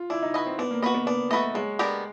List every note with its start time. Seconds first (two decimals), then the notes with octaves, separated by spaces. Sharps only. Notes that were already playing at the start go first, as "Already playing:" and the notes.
Already playing: F4
0.10 D4 E4
0.23 D#4
0.34 F#4 B4 D#5
0.46 C4
0.59 B3 D4
0.71 A#3
0.82 B3 F#4 B4 D#5
0.95 B3
1.07 B3 D4
1.30 A3 F#4 B4 D#5
1.55 F#3 G#3
1.79 B3 D4 G4 A#4